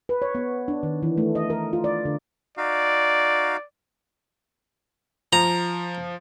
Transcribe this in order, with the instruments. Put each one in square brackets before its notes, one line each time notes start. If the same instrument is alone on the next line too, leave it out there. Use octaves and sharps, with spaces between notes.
[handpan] B4
C#5
B3
D4
D#3
E3
A3
D#5
A#4
F4
D5
D3
[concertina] D#4 F#4 F5 [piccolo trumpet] D5
[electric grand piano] F3 [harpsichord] A#5